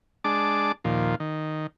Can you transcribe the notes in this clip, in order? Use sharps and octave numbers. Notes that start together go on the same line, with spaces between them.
G#3 D4 A5 D6
D#2 A#2 F3
D#3